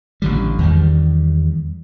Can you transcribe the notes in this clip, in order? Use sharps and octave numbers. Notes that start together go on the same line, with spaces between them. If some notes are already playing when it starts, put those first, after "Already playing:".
A1 D3 G3
E2 D#3 G3